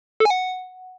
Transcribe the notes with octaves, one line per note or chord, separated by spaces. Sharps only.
A4
G#5
F#5